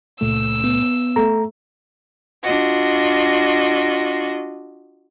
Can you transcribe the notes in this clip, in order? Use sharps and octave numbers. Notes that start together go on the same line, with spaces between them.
C#2 A#2 A3 E6
B3
A3 A#5
D4 F4 F#4 D#5